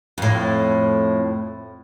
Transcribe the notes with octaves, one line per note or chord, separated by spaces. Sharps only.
F2 A2